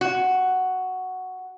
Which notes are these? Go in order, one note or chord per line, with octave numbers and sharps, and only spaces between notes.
F#4